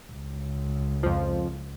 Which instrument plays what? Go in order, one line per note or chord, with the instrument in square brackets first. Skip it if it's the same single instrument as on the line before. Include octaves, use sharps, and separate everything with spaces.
[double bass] C#2
[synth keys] F2 F3